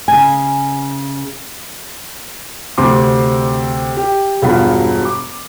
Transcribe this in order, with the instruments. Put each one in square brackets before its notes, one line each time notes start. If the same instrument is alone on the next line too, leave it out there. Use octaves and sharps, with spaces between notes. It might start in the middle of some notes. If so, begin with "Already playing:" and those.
[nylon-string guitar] C#3 G#5
[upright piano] D2 C3 C4 C6 D6
G4
E1 G2 B2 F4 F#5 B5
D6